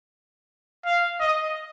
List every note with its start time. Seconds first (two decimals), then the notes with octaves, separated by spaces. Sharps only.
0.85 F5
1.20 D#5